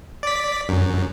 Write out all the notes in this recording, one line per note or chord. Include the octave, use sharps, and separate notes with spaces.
D5 B6
F#2